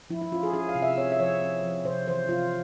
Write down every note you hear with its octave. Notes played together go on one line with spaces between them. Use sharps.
F3 E4
E4
C#4 F4
G#4
C#4 G#4
F5
C3
E5
C4 C#5
E5
F3 C#5
C4
F3
C3 C5
E3 C5
C3 F4